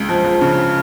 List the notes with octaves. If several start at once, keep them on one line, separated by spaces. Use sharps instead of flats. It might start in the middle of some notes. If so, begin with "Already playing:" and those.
Already playing: C#2
F3
F3
C#3